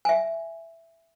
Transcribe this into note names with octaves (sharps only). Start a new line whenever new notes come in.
E5 G#5